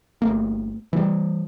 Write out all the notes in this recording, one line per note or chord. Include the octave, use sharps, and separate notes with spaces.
G1 A3 A#3
E3 F#3 G3